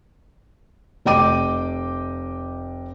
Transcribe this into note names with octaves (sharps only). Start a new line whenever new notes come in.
F1 D#5 G5 D6 D#7